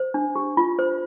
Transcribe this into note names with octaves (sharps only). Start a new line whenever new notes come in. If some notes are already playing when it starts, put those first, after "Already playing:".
Already playing: C5
D4
G4
F4
C5